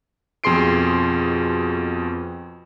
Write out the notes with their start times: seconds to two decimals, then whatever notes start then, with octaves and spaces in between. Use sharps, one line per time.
0.44 F2 B2 G#4 C6 C7 D7